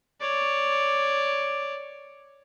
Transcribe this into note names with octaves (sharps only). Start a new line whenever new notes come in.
C#5 D5